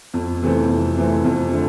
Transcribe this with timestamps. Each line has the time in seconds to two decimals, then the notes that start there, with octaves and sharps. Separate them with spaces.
0.14 F2
0.42 C3 E3 A3 C4
0.69 F2
0.97 C3 E3 A3 C4
1.25 F2
1.52 D3 F3 A3